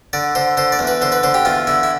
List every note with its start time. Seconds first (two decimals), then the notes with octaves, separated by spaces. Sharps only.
0.13 D3 D5
0.35 D3 C5
0.57 D3 C5
0.72 D5
0.79 E2
0.87 B4
1.01 D3 C5
1.12 B4
1.23 D3 C5
1.34 G4
1.45 E2 F4
1.67 D3 E4
1.83 E4